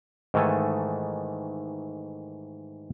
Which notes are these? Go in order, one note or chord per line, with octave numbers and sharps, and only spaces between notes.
G#2 D#3 E3 A3 A4 G#5